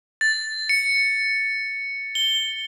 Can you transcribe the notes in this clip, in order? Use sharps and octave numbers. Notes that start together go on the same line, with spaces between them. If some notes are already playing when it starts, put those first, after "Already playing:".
A6
C#7
G7